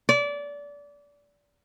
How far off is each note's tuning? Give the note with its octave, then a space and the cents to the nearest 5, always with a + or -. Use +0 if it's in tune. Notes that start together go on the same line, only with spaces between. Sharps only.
D5 -25